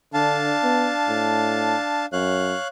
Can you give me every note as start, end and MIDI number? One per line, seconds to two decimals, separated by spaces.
0.14 0.54 50
0.14 2.06 62
0.14 2.06 77
0.14 2.06 81
0.63 0.92 59
1.09 1.76 45
2.13 2.55 42
2.13 2.68 73
2.13 2.68 77
2.13 2.68 90